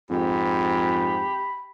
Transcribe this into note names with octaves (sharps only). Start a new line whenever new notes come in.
F2 G#2 G4 B5